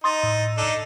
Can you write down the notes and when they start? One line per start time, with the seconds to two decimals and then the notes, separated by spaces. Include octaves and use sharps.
0.04 D#4 C6 D#6 A6
0.23 A2
0.58 D4 D#4 A4